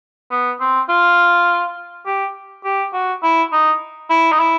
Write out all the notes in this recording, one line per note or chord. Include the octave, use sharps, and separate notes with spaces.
B3
C4
F4
G4
G4
F#4
E4
D#4
E4
D#4
E4